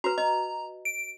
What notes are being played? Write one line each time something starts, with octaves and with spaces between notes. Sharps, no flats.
F#4 B4 A#5
D#5 A#5
D7